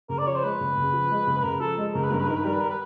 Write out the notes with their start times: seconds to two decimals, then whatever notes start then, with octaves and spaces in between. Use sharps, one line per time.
0.09 C#3 A#4
0.18 D5
0.27 F3 C#5
0.35 C5
0.43 G#3 B4
0.61 C#3
0.77 C#3
0.93 F3
1.10 G#3
1.27 C#3
1.38 B4
1.43 C#3 A#4
1.60 F3 A4
1.77 G#3
1.94 C#3 A#4
2.03 B4
2.11 G2 A#4
2.20 B4
2.28 D#3 A#4
2.37 B4
2.44 G3 A#4
2.53 B4
2.61 A#4
2.70 B4